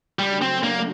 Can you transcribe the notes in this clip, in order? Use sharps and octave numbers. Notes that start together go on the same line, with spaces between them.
C#3 F#3 G3 A3 D4 F#4
C4
A#3